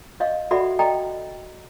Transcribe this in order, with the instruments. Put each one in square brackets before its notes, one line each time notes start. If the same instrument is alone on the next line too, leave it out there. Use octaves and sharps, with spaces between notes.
[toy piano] C#5 D#5 F5
F#4 A4 D5 E5 F#5 B5
A4 D5 D#5 G5 A#5